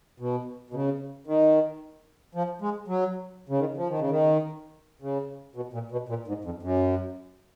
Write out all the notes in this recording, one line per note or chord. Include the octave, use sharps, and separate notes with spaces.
B2
B2
C#3
D#3
F3
G#3
F#3
C#3
D#3
F3
D#3
C#3
D#3
C#3
B2
A#2
B2
A#2
G#2
F2
F#2